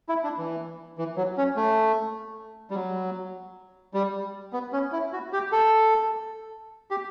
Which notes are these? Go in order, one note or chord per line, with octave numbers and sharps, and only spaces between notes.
E4
D4
E3
E3
F#3
C#4
A3
G3
F#3
G3
B3
C#4
E4
F#4
G4
A4
G4